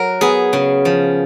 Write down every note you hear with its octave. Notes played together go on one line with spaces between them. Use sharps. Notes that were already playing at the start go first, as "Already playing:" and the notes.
Already playing: F#3 A#4
B3 G#4
C#3
F3